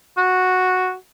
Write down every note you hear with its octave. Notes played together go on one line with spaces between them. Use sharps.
F#4